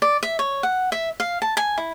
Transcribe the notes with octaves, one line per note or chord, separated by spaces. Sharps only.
D5
E5
C#5
F#5
E5
F5
A5
G#5
E4